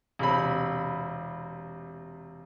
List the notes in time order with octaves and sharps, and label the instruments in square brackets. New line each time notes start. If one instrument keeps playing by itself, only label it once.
[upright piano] E1 C3 B5